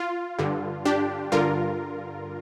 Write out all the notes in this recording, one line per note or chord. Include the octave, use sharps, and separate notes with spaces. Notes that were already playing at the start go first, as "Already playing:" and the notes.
Already playing: F4
G2 D3
D4 G4
G2 D3 F4 A#4